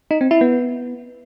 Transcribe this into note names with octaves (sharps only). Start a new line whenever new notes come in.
D#4
C4
E4
B3